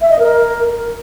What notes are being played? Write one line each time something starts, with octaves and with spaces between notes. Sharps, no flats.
E5
D#5
A#4